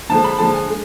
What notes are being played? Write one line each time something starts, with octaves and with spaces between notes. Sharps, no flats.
D3 F3 G#3 A5
B5
D3 F3 G#3 A5
G#5
G#3